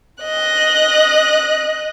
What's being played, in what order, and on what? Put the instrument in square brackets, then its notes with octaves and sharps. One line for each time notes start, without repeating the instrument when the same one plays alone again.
[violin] D#5 F#6